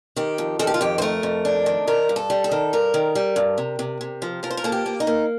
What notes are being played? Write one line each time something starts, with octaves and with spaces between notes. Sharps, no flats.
D#3 G4
F2
D#3 A4
G4
F4
F2 G4
C5
A3 A#4
F2
D4
D#3
D#3 A#4
G2
A4
G3
A4
D#3
G2 A#4
D#3
G3
G2
C3
C3
C3
F3
F3 A#4
C5
A#4
A#3 A4
G4
A#3
D#4
A#3